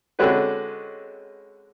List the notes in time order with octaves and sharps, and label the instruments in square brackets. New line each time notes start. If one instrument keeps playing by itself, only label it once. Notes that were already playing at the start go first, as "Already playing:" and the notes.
[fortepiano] D3 G#3 C4 C#4 F#4 B4